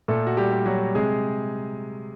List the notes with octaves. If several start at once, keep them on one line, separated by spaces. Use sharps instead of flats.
A#2 A3 A4
F#4
G3 G4
G3
F#3 F#4
C3 G#3 G#4